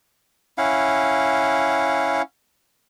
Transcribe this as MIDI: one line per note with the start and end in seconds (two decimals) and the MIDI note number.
0.58 2.22 61
0.58 2.22 64
0.58 2.22 77
0.58 2.22 78